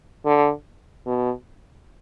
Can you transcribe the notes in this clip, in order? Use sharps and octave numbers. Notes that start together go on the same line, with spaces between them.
D3
B2